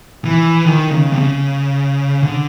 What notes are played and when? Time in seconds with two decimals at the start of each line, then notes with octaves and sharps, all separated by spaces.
0.25 E3
0.65 D#3
0.91 C#3
1.13 C3
1.17 C#3
2.23 D3